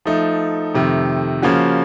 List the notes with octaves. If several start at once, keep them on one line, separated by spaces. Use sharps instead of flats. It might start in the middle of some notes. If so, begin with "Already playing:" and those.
F3 A3 D#4
F2 C3 D#3 A3
C#3 F3 A#3 C#4 F#4